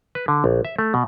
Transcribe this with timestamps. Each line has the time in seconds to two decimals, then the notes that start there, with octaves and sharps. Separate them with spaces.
0.15 B4
0.28 D3
0.44 A#1
0.65 E5
0.79 A3
0.94 B2